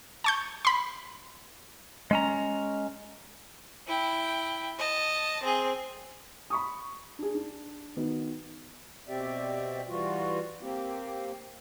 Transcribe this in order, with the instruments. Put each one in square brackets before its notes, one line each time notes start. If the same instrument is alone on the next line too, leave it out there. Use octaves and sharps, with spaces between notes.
[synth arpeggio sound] A5 C#6 G6
B5 C6
[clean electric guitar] G#3 C#4 A#5
[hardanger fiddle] E4 G5
D#5 A5
C4 G#4
[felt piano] B5 C#6 D#6
D4 G#4
D4
D#3 B3 F#4 B4
[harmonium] B2 C4 G4 D5 E5
E3 G3 F4 F#4
A#3 C4 G4